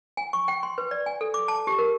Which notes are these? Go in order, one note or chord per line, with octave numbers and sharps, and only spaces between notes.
G#5
C#6
G5
C6
B4
D5
G#5
A4
D6
A5
G4
A#4